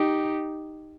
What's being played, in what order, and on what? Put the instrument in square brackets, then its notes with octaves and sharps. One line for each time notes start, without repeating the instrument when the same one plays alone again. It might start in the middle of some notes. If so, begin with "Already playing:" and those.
Already playing: [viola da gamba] D#4 G4